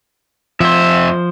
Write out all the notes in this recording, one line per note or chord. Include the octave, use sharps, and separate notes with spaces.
F2 F3 C5 E5